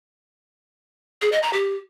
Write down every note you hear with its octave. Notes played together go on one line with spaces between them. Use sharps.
G#4
D#5
A#5
G4